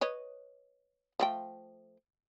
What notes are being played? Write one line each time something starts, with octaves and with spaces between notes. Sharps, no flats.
B4 C#5 D#5
F3 A3 G5